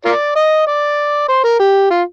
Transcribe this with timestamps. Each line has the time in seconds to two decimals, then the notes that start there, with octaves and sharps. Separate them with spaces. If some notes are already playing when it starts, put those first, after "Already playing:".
0.05 F4 A#4 D5
0.36 D#5
0.67 D5
1.28 C5
1.44 A#4
1.59 G4
1.90 F4